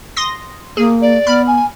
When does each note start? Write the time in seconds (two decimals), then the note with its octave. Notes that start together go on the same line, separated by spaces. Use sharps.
0.17 C6 D#6 A#6
0.77 A#3 G#4
1.02 D5
1.27 B3 B5 F6
1.47 G#5